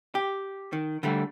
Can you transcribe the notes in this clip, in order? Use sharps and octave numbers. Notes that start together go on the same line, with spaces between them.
G4
D#3
D3 G3 A3